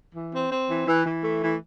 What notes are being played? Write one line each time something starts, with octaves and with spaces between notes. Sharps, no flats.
E3
C4
C4
E3
E3
E3
A3
E3